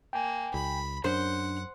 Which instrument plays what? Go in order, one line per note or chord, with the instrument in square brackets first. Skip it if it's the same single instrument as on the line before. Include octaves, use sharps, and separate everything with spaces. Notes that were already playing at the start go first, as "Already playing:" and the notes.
[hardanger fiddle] A#3 [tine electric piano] G5 G#5
[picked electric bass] C#2 [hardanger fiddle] B5
[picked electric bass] F#2 [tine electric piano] D4 [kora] C5 [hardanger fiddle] F#5